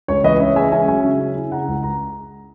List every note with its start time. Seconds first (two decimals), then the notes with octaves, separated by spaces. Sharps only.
0.08 C#2 C#5
0.24 E3 B4 D#5
0.40 C#3 C#5 E5
0.56 G#3 E5 G#5
0.72 C#4 E5 G#5
0.88 F#3 E5 G#5
1.04 C#3
1.20 C#4
1.36 E4
1.52 C#3 F#5 A#5
1.68 C#2
1.83 A#5